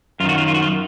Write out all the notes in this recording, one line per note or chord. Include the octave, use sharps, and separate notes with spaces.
F#2 D#3 F4 F#4
F4
F4
F#4
F4